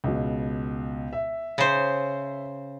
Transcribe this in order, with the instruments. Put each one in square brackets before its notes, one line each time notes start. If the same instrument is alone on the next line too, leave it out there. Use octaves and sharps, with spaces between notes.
[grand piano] C#2 B2
E5
[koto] C#3 C5